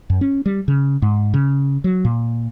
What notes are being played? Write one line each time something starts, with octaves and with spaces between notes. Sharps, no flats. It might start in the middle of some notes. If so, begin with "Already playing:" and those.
F#2
C#4
G3
C#3
G#2
C#3
F#3
A#2